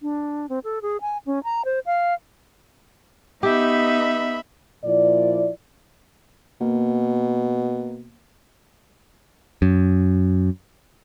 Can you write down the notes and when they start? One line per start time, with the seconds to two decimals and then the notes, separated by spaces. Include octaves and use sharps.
0.02 D4
0.49 C4
0.64 A4
0.82 G#4
1.01 G#5
1.26 C#4
1.44 A#5
1.65 C5
1.86 F5
3.43 B3 D#4 G4 E5 B5
4.84 A#2 F3 E4 D5
6.61 B2 A#3
9.62 F#2